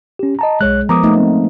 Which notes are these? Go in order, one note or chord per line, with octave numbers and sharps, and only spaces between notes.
C#4 G4
D#5 A5 A#5
B1 G#3 C#5 F#6
F3 B3 A#4 A#5 D6 D#6
A3 A#3 D#4
C4